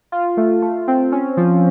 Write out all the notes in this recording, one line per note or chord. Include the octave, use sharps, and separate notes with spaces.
F4
A3
A3
C4
C#4
F3